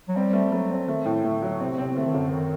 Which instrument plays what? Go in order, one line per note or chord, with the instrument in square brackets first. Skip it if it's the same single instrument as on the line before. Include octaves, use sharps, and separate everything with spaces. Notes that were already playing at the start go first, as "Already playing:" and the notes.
[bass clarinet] F#3
[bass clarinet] G3 [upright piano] C4
[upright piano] A3
[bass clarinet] F#3 [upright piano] A3
[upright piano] C4
[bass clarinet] D#3 [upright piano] A3
[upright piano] A2
[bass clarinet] D3 [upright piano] A3
[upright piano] F#3
[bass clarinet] C3 [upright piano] C4
[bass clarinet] C3 [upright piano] C4
[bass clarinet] D3 [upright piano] A3
[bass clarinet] D#3
[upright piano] F#2 [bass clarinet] D3
[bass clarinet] D#3